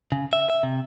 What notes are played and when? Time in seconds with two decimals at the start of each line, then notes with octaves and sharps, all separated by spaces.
0.12 C#3
0.33 E5
0.50 E5
0.63 C3